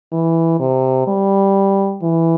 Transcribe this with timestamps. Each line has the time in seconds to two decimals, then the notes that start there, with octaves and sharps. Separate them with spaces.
0.12 E3
0.60 C3
1.07 G3
2.03 E3